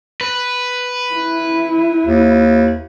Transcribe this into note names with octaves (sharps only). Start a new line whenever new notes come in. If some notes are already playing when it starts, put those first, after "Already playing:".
B4
E4
D#2